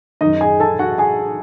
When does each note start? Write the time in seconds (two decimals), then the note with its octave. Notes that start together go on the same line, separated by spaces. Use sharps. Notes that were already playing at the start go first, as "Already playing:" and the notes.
0.21 F#2 D#3 D#4 D#5
0.41 G#4 G#5
0.60 A4 A5
0.79 F#4 F#5
0.98 G#4 G#5